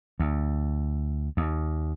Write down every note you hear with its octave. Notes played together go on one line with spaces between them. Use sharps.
D2
D#2